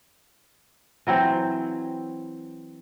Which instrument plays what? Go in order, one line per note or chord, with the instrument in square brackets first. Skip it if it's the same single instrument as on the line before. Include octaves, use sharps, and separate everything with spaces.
[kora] E3 F#3 C4 C5